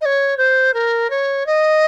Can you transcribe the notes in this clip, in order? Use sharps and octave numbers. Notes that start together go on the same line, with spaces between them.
D#5
C#5
C5
A#4
C#5
D#5